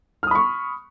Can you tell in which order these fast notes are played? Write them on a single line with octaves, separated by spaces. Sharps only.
F6 D#6 B5 C#6